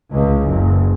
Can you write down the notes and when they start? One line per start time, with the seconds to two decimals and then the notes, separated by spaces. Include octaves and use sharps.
0.12 C#2
0.45 F#1